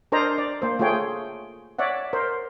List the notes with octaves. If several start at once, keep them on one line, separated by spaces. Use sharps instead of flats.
D4 A#4 C5 D5 D#5 A#5
D5
A#3 C5
A3 F4 G#4 C#5 G5
C#5 D5 E5 F#5
A#4 C5